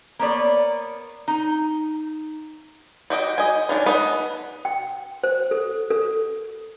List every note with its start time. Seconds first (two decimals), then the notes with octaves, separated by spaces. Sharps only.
0.19 A#3 B3 C#5 D5
1.28 D#4
3.10 F#4 G4 D#5 G5
3.38 D#5 G#5
3.69 D#3 C#4 D4
3.86 B3 D#4 B4
4.65 G5
5.24 C5
5.51 A4
5.91 A4